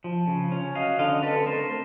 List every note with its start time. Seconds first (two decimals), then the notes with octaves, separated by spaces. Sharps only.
0.04 F3
0.27 C#3
0.52 C#4
0.75 F#3 D#5 F5
0.99 D3 D#5 F5
1.22 C4 A4 B4
1.46 A3 A#4 C5